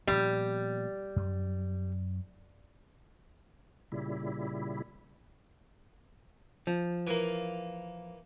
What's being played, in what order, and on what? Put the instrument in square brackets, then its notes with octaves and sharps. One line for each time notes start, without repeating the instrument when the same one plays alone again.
[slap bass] A#2 F3 B3 [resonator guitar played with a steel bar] G3
[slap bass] F#2
[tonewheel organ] A#2 C#3 G3 E4
[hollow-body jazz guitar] F3
[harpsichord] E3 A#3